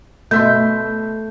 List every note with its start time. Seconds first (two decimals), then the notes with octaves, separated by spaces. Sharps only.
0.31 B2 A3 E5 C6 G6